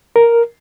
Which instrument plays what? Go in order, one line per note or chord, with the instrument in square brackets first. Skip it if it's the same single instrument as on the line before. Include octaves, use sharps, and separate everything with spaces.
[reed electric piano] A#4